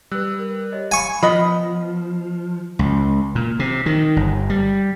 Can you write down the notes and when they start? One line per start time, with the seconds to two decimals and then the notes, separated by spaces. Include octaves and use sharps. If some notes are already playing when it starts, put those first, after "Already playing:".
0.11 G3 B4 E6 F#6
0.39 A#4
0.72 G4 C#5 D#5
0.92 F5 G#5 B5 C#6
1.23 F3 B3 D#5 B5
2.79 C#2
3.35 A#2
3.59 C3
3.86 D#3
4.16 G1
4.50 G3